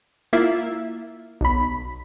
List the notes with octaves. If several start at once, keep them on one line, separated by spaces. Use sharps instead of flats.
A#3 E4 F4 E5
B1 B5